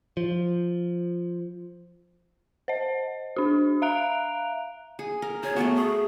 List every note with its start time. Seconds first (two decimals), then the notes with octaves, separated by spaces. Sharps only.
0.17 F3
2.68 C5 D#5
3.36 D4 F#4
3.82 E5 F5 A#5 F#6 D7 F7
4.99 G#4
5.22 A#4
5.43 G#4 C#5
5.56 A3 B3 F#4
5.75 G#4